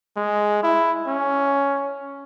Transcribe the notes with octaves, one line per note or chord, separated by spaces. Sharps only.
G#3
E4
C#4